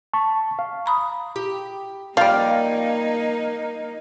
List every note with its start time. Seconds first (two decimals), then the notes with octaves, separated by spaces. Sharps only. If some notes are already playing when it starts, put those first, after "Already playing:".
0.13 A5 C#6
0.59 F5
0.86 A#5 B5 D#6
1.36 G4
2.17 F3 G3 A#3 D#4 F5